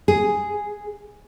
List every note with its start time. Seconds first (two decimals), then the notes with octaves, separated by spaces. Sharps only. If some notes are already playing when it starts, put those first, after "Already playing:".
0.08 G#4